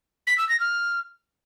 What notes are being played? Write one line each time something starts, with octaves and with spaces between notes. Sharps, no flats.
B6
E6
A#6
F6